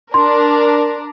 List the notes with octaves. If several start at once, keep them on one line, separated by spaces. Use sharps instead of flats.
D4 A#4 C6